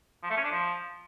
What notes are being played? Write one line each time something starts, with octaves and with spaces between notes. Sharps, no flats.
F3
A3
C#4
D4
F3